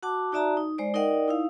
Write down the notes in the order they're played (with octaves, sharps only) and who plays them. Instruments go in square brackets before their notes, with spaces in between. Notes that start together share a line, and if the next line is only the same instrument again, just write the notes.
[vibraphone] F#4 F#5 A5 D6
D#4 F#4 D5 E5 A5 A#5
D#4
G#3 C5 D5
D#4 A#4 D5 D#5 F#5 G5
D#4 E4 F5